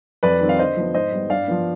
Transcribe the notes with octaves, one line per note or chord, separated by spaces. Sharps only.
F2 B4 D5
D#3 G3 C4
F5
D3 C5 D#5
F3 B3
G#2 C5 D#5
G3 B3
G2 D5 F5
F3 B3